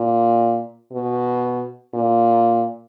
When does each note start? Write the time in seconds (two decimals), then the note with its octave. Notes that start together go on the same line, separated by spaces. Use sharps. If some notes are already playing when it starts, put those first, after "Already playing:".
Already playing: A#2
0.92 B2
1.94 A#2